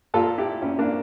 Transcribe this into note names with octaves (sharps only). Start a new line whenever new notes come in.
A#2 F4 A4
E4 G4
A#2 C#4 E4
A#3 D4